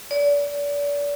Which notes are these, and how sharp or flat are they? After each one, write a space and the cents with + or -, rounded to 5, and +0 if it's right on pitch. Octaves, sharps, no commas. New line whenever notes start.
D5 -35